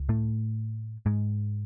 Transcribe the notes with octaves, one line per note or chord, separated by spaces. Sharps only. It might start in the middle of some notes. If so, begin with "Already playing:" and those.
Already playing: C#2
A2 A3
G#2 G#3